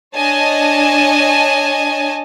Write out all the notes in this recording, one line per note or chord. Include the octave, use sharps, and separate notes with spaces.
D4 C#5 D#5 G#5 A5